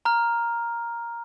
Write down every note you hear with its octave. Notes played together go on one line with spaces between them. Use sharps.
A#5 F6